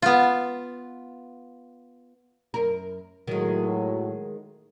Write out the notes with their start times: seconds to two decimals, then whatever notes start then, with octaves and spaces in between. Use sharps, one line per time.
0.02 B3 F4
2.54 F#2 A#4
3.27 A2 D#3 F#3 G#3